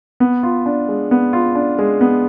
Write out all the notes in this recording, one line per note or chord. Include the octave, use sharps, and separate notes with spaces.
B3
F4
D4
G#3
B3
F4
D4
G#3
B3